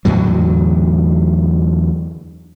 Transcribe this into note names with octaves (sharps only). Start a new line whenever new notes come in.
E2 A2 D3 F#3